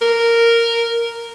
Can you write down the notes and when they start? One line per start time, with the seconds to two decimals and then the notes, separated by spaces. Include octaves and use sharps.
0.02 A#4